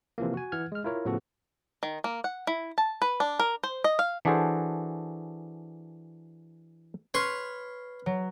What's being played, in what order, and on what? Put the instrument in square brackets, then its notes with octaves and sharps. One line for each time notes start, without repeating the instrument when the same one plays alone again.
[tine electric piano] C3 E3 F3 A#3
F#4 G#5
E3 F#5 F6 G#6
G#3 F6
E4 F4 A#4 C#5
A2 C#3 F3 B3 F#4 A4
[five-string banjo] D#3
A#3
F#5
E4
A5
B4
D4
A#4
C5
D#5
F5
[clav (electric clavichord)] E3 D4 F#4 G#4 A4 C5
[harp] B4 F6 [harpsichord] C#5 C6 C#6
[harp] F#3